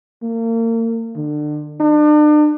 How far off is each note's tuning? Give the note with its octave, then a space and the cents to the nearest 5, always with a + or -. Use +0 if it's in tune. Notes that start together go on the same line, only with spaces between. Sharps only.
A#3 -35
D3 +30
D4 +35